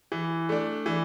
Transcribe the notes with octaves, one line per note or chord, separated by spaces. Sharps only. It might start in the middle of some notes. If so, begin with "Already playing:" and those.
E3
A3 D4
E3